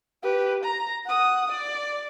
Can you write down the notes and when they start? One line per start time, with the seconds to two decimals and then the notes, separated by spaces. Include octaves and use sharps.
0.23 G4 B4
0.63 A#5
1.06 F#5 D#6
1.51 D5